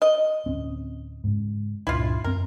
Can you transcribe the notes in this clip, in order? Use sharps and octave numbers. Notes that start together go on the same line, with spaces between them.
D#5
D1 C4 C#4
G#2 C#3
C#2 G2 A#2 E4 F4
F#2 C4 A#4